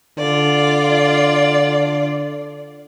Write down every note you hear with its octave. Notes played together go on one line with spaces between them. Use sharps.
D3 F4 D5